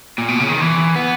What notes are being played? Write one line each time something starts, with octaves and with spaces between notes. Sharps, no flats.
A#2
B2
C#3
D#3
E3
B3